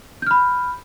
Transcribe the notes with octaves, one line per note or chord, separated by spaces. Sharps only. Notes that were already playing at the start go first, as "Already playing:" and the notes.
B5 F6 G6